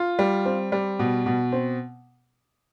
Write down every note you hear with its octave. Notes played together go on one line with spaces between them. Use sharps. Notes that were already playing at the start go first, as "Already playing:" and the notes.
Already playing: F4
G3
C4
G3
B2
B2
C4